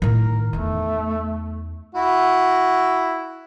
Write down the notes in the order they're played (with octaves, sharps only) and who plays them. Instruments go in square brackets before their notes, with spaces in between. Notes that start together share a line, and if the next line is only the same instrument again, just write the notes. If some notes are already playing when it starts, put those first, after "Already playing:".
[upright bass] A2 D#3 [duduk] A#4
[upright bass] E2 D#4 [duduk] A3
[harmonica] E4 F#4